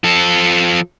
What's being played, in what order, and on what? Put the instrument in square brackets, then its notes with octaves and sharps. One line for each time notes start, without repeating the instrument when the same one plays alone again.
[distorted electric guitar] F3 A4